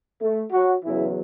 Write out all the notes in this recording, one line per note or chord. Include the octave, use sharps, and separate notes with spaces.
A3
F#3 F#4
E2 C#3 E3 F#3 E4